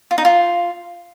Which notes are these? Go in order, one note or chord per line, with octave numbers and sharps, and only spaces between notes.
F4
D#4
F4